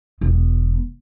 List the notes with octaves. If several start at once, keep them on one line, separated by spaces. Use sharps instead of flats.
E1 B3